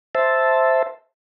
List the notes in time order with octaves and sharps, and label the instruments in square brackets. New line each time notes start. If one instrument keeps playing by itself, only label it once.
[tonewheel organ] C5 E5 A5